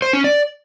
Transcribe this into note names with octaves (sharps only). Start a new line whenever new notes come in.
C5
C#4
D5